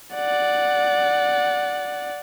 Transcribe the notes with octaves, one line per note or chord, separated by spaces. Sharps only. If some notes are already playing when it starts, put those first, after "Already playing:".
D5 F#5